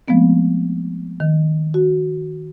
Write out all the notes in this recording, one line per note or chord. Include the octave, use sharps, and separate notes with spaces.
F3 G#3 A3 B3 C4
D#3
F#4